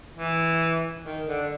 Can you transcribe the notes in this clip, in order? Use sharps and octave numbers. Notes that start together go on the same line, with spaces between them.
E3
D#3
D3